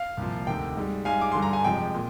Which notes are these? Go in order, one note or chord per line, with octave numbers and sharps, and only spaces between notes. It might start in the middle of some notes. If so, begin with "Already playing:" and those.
Already playing: F5
C2 A#2 F3
D2 C3 D#3 G5
G#2 G3
G#2 G3 F5 G#5
D6
G2 D3 G3 C6
A#5
G#5
F2 C3 F3 G#3 G5
A#2